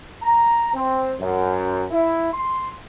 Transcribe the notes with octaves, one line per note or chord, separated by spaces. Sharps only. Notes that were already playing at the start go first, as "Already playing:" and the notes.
A#5
C4
F#2
E4
C6